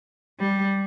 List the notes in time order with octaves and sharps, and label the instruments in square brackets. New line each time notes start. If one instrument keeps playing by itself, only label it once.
[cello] G3